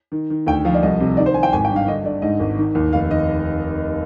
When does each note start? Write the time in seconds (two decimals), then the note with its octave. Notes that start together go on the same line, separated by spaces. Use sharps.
0.12 D#3
0.30 D#3
0.47 D2 G5
0.65 F3 F5
0.74 D5
0.83 C2 D#5
1.00 C3
1.17 D#3 D5
1.26 C5
1.34 D#3 G#5
1.43 G5
1.53 G#1 G#5
1.65 G5
1.70 G2
1.76 F5
1.88 D3 D#5
2.05 D3 D5
2.22 G#2 D#5
2.40 G#1
2.58 D#3
2.75 D#2
2.92 F1 F5
3.11 D#3 D#5